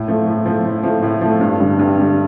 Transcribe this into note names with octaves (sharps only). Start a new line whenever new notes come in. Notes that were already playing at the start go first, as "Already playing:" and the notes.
Already playing: A2
F3 A3
A2
F3 A3
A2
F3 A3
A2
F3 A3
G2
D3 G3
G2
D3 G3